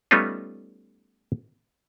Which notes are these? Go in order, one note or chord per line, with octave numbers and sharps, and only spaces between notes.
G3 A3 B3 C#4 D#4 F4